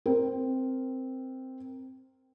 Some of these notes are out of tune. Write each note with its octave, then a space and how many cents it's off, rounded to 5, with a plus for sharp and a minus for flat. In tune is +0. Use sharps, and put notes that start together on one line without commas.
C4 +0 A#4 +0